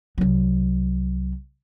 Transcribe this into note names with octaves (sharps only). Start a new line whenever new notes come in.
C2 F#3